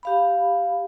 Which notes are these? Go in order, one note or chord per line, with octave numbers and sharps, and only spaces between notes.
G4 F5 B5